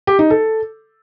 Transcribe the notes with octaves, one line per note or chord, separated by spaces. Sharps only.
G4
D#4
A4